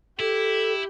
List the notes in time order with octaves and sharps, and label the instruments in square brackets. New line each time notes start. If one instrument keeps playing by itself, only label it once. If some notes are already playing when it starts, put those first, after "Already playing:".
[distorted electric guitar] E4 [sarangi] G4 [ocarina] A4